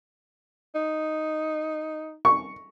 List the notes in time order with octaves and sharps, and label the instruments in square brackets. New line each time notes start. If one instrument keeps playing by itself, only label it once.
[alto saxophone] D#4
[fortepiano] C#6